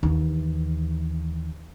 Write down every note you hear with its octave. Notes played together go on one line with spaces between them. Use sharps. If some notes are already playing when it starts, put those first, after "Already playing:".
D#2 E3